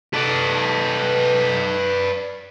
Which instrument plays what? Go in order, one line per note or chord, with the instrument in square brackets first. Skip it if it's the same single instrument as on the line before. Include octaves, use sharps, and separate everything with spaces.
[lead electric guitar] D#4 A4 [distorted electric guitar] B4 D5